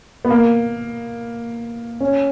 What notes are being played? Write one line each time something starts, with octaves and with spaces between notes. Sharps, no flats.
B3
A#3
C#4